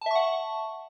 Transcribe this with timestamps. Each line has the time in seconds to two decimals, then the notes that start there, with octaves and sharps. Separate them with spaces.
0.01 A5
0.06 E5
0.11 C#6
0.15 F#5